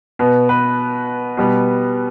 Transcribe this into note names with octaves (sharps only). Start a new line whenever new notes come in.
B2 B3
B4
B2 G3 B3